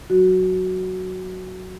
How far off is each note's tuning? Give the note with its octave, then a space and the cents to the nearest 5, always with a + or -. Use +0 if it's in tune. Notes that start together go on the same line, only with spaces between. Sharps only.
F#3 +0 F#4 +0